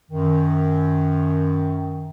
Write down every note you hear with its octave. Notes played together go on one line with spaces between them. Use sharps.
F#2 D#3